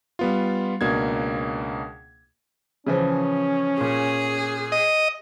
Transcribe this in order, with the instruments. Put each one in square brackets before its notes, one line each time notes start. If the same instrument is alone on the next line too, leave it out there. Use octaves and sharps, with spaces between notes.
[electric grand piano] G3 B3 F4
C#2 B2 A#3 D4 G#6
[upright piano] C#3 E3 F3 [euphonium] C#4
[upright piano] A#2 [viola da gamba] G#4
[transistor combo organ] D#5